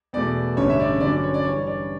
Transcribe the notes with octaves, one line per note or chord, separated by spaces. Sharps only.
E2 B2 A3 D5
A1 G2 D3 G3 C#4 C#5
E5
D5
G2 D3 F#3 C#4 D5
D5
C#5
D5
G2 E3 G3 C#5
D5